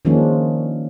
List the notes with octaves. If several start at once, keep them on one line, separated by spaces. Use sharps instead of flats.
D#3 F3 G#3 A#3 C#4 D4